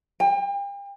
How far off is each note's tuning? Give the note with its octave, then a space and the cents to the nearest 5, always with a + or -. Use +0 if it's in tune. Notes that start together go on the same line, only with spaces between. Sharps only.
G5 +40